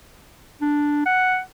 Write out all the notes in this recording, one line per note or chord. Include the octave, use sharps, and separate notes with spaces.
D4
F#5